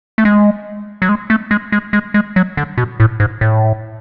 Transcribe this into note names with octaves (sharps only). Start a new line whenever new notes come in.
A3
G#3
F#3
G#3
A3
G#3
G#3
G#3
G#3
F#3
D3
B2
A2
G#2
A2